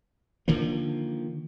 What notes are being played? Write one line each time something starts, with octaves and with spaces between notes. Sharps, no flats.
D3 D#3 F3 A#3